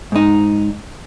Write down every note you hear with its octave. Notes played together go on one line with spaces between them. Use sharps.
G#2 D#4